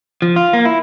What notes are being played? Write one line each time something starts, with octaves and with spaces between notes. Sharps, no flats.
F3
F4
A#3
E4